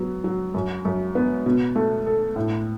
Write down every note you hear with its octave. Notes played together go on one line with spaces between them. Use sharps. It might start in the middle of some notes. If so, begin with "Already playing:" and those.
Already playing: F#3 B3
F#3
F#2
F#2
B3
B2
A3
A4
A2